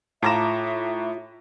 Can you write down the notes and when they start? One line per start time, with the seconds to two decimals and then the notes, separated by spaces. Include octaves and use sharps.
0.22 A2 F4 E5 A5 A#5 D6 A#6 E7